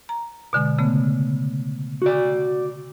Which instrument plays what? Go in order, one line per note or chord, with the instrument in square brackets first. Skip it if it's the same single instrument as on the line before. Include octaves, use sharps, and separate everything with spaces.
[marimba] A#5
B2 D3 G#3
C#3 A3 B3
[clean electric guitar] F#4 D5